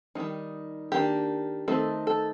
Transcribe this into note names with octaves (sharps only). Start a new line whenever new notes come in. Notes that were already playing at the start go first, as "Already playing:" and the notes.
D#3 G3 A#3 D#4
D#3 A#3 D4 G4
D#3 A3 C4 D#4 A4
A4